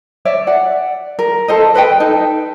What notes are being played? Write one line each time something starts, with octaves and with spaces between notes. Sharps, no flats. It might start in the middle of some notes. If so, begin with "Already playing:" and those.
C#5 D5 E5
D5 F#5
A#4
A4 C5 D#5
A4 B4 D#5 G5
D#4 A4